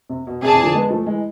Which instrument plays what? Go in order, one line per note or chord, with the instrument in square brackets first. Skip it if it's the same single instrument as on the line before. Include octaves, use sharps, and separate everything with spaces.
[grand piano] C3
B2
[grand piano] C3 [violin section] G#4 D5 A5
[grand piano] C3 E3
D3 F3
G#3 B3
F3 A3
E3 G#3